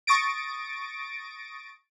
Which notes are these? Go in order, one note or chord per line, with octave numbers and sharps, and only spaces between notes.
C#6 D#6 A6 A#6 D7